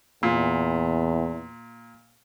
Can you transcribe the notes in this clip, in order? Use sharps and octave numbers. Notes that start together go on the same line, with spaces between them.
E2 A#2